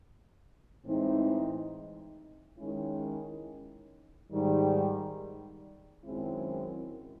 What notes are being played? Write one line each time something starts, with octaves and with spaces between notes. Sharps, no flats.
A2 E3 G#3 C4 D#4
D#3 G#3 C#4 E4
G#2 D#3 G3
F#2 D#3 G#3 C4 E4